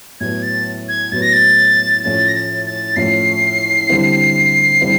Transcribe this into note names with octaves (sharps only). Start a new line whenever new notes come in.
A2 F#3 B3 G#6
A6
G#6
A2 F#3 B3 A6
A#6
A6
A2 F3 A3 C#4 E4 A6
A#6
A6
A6
A2 F3 A3 C#4 E4 C7
D3 G3 C4 E4
D3 G3 C4 E4